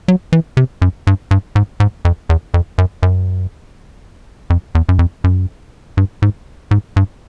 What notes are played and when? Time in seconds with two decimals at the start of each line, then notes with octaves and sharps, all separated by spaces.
0.08 F#3
0.33 E3
0.57 C3
0.82 F#2
1.07 G2
1.31 G2
1.55 G#2
1.80 G#2
2.05 F2
2.29 E2
2.54 F2
2.78 F#2
3.03 F#2
4.50 F2
4.75 E2
4.89 F#2
4.99 F2
5.24 F#2
5.97 G2
6.22 G#2
6.71 G#2
6.96 G2